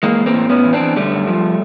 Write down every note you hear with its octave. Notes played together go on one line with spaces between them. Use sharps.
E3 G#3 A#3
E3
A#3 C4
A2
A2 B3 C#4
E3
C4 D4
E3
D3 G3 A3
F#2
F3